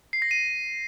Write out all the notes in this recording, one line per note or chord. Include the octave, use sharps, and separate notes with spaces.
C7
A#6
D#7